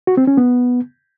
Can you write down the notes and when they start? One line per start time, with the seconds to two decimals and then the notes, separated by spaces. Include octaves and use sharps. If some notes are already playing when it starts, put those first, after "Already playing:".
0.07 F#4
0.17 C4
0.27 C#4
0.37 B3